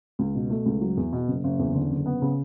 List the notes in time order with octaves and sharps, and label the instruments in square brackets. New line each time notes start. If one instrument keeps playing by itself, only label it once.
[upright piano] C#2
B2
A3
C#2
F#3
E2
B2
F#1
F#1
E2
D3
F#1
B3
C#3